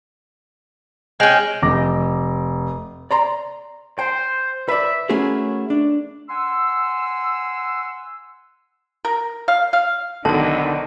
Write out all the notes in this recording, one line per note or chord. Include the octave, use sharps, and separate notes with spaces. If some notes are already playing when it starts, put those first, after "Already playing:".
G#3 C#4 G5
F1 D6 A#6
D5 A#5 C6
C5 G5
B4 D5 E5
A3 C#4 E4 F#4 G#4 A#4
D4
F#5 G#5 C6 E6
A#4
F5
F5
B1 D3 D#3 A5